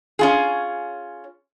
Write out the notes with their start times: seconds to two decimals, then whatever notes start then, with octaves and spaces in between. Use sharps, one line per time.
0.19 C#4 F4 G#4